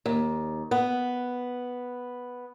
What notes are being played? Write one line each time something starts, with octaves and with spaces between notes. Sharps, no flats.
D#2
B3